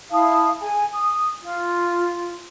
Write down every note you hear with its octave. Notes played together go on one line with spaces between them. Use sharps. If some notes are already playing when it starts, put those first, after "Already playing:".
E4 F5 A5 D#6
G#4 G#5
D#6
F4